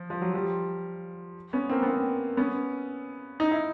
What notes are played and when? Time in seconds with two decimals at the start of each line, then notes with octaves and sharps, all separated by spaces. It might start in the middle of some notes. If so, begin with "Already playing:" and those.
Already playing: F3
0.10 F3
0.22 F#3
0.34 F3 G3
1.53 B3 C#4
1.69 A#3 C4
1.83 B3
1.87 A#3 C4
2.37 B3 C#4
3.40 D#4
3.51 E4